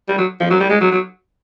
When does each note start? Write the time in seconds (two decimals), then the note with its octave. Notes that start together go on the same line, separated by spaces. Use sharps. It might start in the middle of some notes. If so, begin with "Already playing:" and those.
0.08 G3
0.18 F#3
0.40 F3
0.50 F#3
0.60 G3
0.70 G#3
0.81 F#3
0.92 F#3